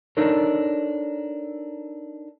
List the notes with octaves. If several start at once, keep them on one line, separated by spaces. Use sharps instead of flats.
D4 D#4 A4 A#4 C#5